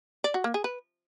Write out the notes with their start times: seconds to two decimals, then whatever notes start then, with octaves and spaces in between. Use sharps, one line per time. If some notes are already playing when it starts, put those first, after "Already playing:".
0.24 D5
0.34 F#4
0.44 A#3
0.54 G#4
0.64 B4